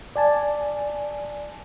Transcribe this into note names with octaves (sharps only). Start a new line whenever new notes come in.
D5 G#5 A5